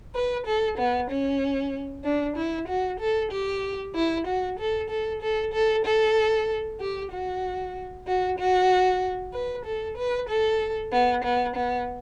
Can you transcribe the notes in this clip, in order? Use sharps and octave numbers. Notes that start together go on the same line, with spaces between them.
B4
A4
B3
C#4
D4
E4
F#4
A4
G4
E4
F#4
A4
A4
A4
A4
A4
G4
F#4
F#4
F#4
B4
A4
B4
A4
B3
B3
B3